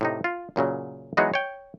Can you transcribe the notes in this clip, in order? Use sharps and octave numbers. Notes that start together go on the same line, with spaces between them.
A2 C3 D#4
F4
F#2 A#2 C#3 F#3
E3 F#3 G#3 B3 D#4 F#4
C#5 G5